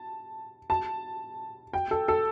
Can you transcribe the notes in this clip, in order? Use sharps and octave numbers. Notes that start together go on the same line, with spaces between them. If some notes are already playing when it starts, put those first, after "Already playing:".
Already playing: A5
A5
G5
A4
A4